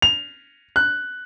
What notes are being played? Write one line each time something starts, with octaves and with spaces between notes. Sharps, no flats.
F7
F#6